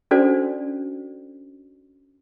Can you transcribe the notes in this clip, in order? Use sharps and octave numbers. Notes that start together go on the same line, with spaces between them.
C#4 D4 F#4 A4 C5 D5